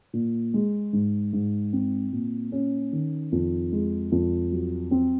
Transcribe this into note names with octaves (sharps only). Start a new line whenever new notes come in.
A#2
G#3
G#2
G#2
C4
A#2
C#4
D#3
F2
G#3
F2
F#3
C4